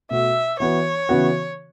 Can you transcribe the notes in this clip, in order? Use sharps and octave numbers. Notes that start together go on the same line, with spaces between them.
B2 A3 F#4 E5
E3 B3 F#4 C#5
C#3 E3 B3 F#4